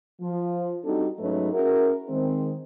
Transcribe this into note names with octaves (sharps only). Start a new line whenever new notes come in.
F3
G3 C4 D4 D#4 F#4 A4
G#2 F#3 A3 C#4 D#4 B4
C#4 E4 F#4 G#4 A#4
D#3 G#3 C4